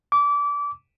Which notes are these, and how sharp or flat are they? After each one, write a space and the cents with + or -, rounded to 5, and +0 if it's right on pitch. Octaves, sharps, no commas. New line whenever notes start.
D6 -25